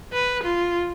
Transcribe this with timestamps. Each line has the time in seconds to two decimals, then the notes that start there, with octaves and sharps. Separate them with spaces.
0.13 B4
0.44 F4